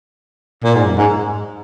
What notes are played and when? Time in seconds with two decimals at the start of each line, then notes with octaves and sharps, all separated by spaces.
0.64 A#2
0.75 G#2
0.86 F#2
0.97 G#2